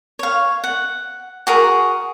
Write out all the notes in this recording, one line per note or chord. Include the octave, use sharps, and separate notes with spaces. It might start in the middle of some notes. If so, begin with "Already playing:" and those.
C#5 F5
F#5
F#4 G#4 A#4